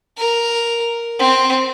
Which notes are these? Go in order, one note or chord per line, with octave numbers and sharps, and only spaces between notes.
A#4
C4